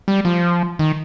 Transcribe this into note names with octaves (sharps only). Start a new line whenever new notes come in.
G3
F3
D#3